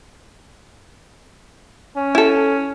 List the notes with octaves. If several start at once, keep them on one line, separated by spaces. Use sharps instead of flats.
C#4
E4 A4